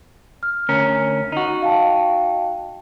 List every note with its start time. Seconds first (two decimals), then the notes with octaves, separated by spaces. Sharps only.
0.43 F6
0.69 D2 C#4 A#4
1.32 D#4 F#4
1.62 F5 G5 A5